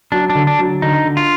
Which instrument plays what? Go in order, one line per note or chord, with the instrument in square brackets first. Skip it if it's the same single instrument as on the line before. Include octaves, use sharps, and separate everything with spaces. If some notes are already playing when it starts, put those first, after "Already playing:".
[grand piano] F#3 [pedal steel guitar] D4
[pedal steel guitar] D4
[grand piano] D3
[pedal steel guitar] D4
[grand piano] F#3
[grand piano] D3 [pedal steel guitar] D#4
[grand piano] D3
[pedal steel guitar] F4